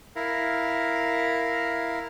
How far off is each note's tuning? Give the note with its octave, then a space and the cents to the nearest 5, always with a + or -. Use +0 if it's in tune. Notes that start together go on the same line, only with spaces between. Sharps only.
E4 +0 A#4 +0 F5 +0